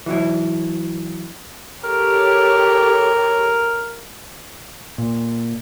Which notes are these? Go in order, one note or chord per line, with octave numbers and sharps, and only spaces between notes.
E3 F#3 E4
G4 A4 A#4 C#5
A#2